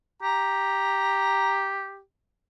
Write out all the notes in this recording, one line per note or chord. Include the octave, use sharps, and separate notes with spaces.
G4 A#5